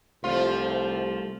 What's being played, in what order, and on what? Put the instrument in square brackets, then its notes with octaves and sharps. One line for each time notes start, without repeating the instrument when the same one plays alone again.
[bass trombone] C2 [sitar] F3 F4 [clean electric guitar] G3 A3 [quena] C5